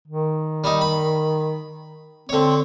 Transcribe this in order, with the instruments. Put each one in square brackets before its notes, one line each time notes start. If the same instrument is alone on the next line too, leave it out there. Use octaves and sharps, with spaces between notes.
[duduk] D#3
[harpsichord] G3 D#4
B5
[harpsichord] D3 C#5 [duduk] C4